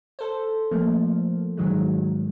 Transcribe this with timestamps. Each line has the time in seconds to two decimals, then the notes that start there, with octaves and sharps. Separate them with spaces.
0.19 A4 C5
0.71 F3 A3 A#3
1.57 G#2 D#3 F#3 G#3